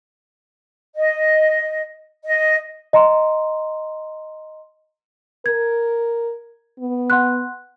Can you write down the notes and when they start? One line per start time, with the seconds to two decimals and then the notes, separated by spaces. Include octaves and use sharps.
0.96 D#5
2.26 D#5
2.93 D#5 A#5 C6
5.46 A#4 G#6
6.79 B3
7.10 F#5 C6 F#6